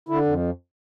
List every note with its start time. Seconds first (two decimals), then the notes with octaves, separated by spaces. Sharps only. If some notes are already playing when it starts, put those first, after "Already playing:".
0.09 D3 E4
0.26 F2